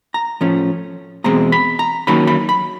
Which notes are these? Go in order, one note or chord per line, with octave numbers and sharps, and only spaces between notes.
A#5
A2 F3 A3 C#4
E2 B2 G#3 C4 A#5
B5
A#5
D#3 F#3 A#3 C#4 B5
B5
B5